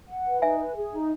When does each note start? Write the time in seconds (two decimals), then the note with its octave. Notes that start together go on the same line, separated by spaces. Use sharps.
0.09 F#5
0.26 B4
0.42 D#4 E5 G#5
0.60 B4
0.76 G#4
0.92 D#4